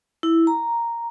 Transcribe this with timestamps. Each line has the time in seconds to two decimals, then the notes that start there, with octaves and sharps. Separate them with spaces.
0.23 E4
0.47 A#5